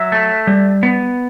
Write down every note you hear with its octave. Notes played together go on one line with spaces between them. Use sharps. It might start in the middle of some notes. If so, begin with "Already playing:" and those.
Already playing: F#3 E5
A3
G3
B3